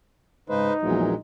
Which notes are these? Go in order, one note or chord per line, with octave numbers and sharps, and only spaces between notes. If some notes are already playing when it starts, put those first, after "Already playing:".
G#2 C#3 D#4 B4 C5
A#1 E2 A#2 E3 F#3 G#3